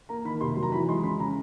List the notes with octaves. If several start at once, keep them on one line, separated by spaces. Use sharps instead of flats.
A#3 A#5
D#3 B5
C3 C6
F#3
A#5
E3 B5
G#3 C6
C#3 B5
C#3 A#5